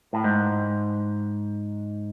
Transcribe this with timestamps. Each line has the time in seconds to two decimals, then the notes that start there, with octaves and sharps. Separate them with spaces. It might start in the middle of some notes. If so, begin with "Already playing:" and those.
0.13 A2
0.24 G#2